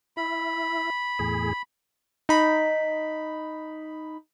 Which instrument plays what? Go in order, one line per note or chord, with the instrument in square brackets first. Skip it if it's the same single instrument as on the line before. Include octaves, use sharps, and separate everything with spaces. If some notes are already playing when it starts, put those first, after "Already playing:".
[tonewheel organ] E4 [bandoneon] B5
[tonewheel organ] E2 A2 G#4
[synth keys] D#4 B5